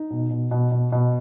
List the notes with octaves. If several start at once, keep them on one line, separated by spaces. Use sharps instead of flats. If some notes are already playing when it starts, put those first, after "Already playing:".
Already playing: D#4
B2
B2
B2
B2
B2